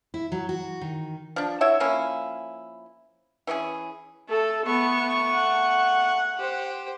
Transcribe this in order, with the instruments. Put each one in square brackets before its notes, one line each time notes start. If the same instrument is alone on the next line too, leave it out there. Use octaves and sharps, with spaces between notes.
[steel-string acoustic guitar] E4
F#3
F#4
D#3
[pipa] F3 D4
E4 F#4 C#5 E5
F3 A#3 C#4 E4
E3 C#4 E4 G#4
[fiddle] A3 [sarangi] A4
[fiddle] A3 C#6 [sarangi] B3
[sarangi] F#5
[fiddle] G4 C5